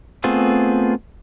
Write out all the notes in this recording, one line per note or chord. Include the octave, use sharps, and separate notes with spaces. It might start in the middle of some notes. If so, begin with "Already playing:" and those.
A3 B3 C4 F4 G#4